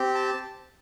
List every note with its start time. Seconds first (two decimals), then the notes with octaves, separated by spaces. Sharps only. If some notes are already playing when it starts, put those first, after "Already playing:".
Already playing: C4 G4
0.15 A5